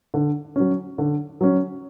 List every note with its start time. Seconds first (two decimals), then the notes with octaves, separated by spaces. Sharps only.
0.14 D3
0.56 F#3 C#4
0.98 D3
1.41 F#3 C#4